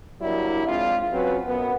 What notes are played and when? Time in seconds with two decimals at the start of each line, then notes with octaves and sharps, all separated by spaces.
0.21 F#3 G3 A#3 D4 E4
0.67 G#3 C4 D4 F4
1.12 F#3 C4 C#4 F#4 B4
1.46 F#2 B3